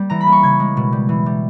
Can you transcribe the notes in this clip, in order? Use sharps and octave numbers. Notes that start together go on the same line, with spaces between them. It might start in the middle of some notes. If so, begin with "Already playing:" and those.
Already playing: G3 A#3
E3 A#5
B5
A#3
C#6
C#3 G#6
G#3
B2
G3
E3
G3